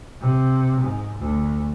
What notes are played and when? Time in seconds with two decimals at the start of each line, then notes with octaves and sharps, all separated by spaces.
0.21 C3
0.80 G#2
1.19 D2